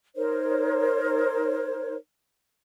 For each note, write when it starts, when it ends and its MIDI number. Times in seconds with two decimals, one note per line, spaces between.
0.16 1.94 63
0.16 1.94 70
0.16 1.94 72
0.16 1.94 73